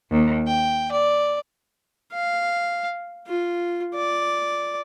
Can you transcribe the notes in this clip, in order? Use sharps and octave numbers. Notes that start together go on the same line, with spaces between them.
D#2
G5
D5
F5
F4
D5